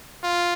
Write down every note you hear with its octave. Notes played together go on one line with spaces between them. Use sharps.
F4